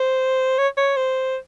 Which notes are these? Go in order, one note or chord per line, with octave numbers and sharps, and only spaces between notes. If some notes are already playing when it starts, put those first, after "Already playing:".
Already playing: C5
C#5
C#5
C5